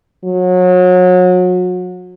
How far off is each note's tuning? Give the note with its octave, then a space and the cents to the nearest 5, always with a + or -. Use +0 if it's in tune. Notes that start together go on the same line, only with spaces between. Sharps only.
F#3 -30